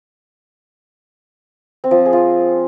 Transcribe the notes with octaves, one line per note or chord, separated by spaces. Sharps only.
C4
F3
C4
G#4
F4